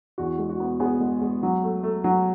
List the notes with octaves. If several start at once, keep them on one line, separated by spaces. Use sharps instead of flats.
E2 F#4
G#3
F#4
B3
B3 G#4
G#3
G#3
F#3
A3
A3
F#3